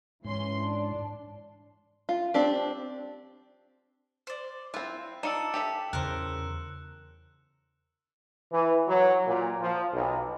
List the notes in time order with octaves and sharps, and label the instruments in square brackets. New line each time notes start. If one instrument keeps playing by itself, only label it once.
[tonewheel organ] G#2 [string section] E3 C#4 C6
[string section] D4
[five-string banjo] F4
C4 D4 G4
[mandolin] C5 D5
[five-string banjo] C4 E4 [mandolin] F4 [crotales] F#6
[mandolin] D4 [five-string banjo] D#4 F4 D5 [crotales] E6 C#7 E7
[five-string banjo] G4 A4 E5
[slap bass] E2 C#3 [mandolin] A#4 C5 [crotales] F#6
[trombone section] E3
F#3
A#2
F3
B1